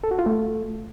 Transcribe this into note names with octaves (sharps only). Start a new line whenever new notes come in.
A4
F#4
F4
A3